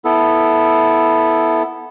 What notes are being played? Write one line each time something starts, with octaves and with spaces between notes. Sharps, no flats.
B3 E4 A4